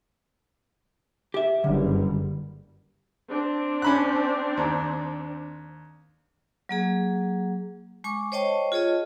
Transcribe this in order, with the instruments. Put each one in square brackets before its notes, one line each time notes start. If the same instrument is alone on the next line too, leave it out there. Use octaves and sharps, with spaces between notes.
[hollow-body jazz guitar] G4 E5
[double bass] F#1 G2 [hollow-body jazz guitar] D3
[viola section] C4 D4
[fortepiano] C#4 B5 F#6
D#2
[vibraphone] F#3 A#3 G#4
G#3 G#5 C#6 D6
C5 C#5 D#5 G5 A5 C#6
F4 G#4 C#5 D#5